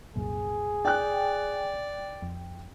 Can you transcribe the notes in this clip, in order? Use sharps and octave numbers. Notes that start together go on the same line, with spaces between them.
C2 F#2 A#2 G#4
D5 G5 F#6
F2